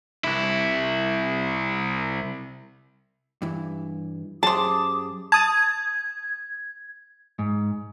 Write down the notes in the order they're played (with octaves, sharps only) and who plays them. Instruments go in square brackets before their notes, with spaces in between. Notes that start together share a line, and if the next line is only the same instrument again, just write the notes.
[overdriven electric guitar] C2 E4
[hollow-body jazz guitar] G2 E3
[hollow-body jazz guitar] F#2 G4 G#4 [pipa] C5 A5 [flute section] D6 D#6
[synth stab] A5 D#6 A6 [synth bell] G#6
[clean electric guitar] G#2